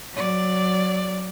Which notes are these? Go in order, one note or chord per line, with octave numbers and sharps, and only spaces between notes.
F#3 D5